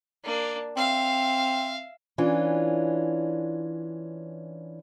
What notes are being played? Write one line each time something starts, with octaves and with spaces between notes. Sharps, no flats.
A#3 D4
C4 E5 F5
E3 C#4 D4 F4